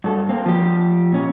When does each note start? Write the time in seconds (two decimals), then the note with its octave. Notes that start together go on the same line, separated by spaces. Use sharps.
0.04 G2 F#3 A4
0.29 A#3 C4
0.46 F3 G4
1.12 A#2 C#4